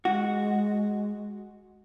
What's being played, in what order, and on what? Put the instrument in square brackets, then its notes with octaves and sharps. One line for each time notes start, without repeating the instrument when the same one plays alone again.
[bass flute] G#3 [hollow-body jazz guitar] F#4